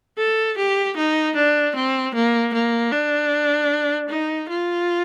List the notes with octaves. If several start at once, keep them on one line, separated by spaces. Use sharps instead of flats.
A4
G4
D#4
D4
C4
A#3
A#3
D4
D#4
F4